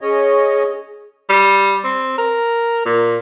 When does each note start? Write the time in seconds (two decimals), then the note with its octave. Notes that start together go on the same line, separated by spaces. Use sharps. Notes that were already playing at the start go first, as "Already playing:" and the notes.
0.01 C#4 G#4 C#5 D#5
1.29 G3
1.84 C4
2.18 A#4
2.85 A#2